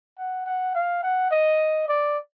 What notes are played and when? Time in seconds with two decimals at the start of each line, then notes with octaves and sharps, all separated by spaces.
0.18 F#5
0.47 F#5
0.75 F5
1.03 F#5
1.31 D#5
1.88 D5